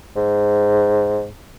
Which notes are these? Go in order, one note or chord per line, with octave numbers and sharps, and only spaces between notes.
G#2